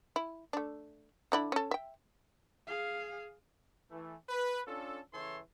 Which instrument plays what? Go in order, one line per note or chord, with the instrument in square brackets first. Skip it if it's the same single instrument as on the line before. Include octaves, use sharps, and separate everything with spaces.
[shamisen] E4
A3 D4
D3 D4 E4
C#4 A4
E5 G5
[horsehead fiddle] G#4 F5
[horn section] E3 A3
B4
C#4 D4 F4 A4
C#3 E3 E4 A4 C#5 C6